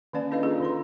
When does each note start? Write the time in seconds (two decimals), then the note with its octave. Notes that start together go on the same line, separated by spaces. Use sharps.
0.13 D#3 A#3 C#4 D5 A5
0.31 D4 E4 A4 B4 D#5 F5
0.43 C#4 D#4 F4 G#4 A4
0.61 D#3 D#4 C6